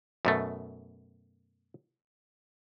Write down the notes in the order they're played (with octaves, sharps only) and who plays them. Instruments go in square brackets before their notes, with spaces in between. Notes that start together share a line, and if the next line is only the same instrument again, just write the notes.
[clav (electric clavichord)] F#2 B2 A3